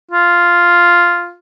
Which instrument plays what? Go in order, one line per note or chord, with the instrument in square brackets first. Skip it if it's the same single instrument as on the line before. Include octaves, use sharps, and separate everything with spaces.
[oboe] F4